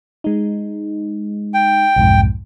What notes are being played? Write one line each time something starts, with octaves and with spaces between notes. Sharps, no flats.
G#3 D#4
G5
B1 F2 G#2